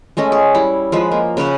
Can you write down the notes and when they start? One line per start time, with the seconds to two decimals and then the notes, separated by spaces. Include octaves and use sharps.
0.17 G#3 A3 C#4 D#5
0.32 G#4
0.55 G3 E4
0.92 F3 G#3 B4
1.11 A#3
1.37 C#3 B4 C#5 F#5